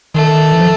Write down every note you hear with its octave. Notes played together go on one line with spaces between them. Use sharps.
D#3 A3
E3
F3